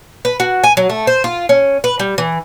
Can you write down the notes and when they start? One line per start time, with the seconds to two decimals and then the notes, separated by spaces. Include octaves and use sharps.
0.25 B4
0.40 F#4
0.64 G#5
0.77 F#3
0.90 A3
1.07 C5
1.24 F4
1.49 C#4
1.84 B4
1.99 G3
2.18 E3